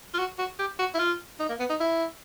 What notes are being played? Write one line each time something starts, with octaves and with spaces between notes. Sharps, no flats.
F4
F#4
F#4
G4
F#4
E4
F4
D#4
A#3
B3
D#4
E4